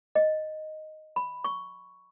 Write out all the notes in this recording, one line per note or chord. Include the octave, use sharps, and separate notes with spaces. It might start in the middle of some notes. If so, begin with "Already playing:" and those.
D#5
B5
C#6